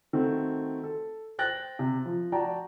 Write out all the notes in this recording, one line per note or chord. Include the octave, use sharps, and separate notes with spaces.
D#3 A3 C4 F#4
A4
C5 G5 F#6 A6 A#6
C3
F3
F#4 D5 G5 A5 A#5